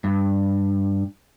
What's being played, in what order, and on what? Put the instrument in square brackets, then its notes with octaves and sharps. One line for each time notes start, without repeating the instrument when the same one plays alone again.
[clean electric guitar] G2